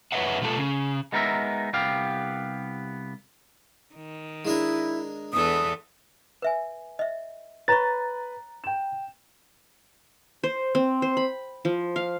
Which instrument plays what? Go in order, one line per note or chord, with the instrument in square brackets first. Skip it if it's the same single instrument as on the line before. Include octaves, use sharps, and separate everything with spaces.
[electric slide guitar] F#2 B4 C#5 D#5 E5 F#5
B2 F3 A3 F4 A4
C#3
[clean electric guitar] G#3 B3 D#4 A#4 B4 E5
C2 B3 G4 F5
[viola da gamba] D#3
[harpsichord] G#3 D4 A#4 [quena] E4
[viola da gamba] E2 B3 A4 [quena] D#6
[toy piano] B4 E5 G#5
D#5 E5
[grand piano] B4 [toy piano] C#5 B5 C#6 [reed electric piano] A#5 A6
[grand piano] G5 E7
[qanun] C5
C4
C5
B5
F3
F5